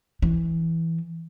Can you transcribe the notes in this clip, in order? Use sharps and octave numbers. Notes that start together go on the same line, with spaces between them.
E3